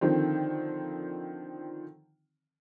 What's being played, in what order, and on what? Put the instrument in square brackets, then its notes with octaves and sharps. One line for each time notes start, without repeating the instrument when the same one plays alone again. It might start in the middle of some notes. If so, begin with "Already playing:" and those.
[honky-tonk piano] D3 D#3 F3 C4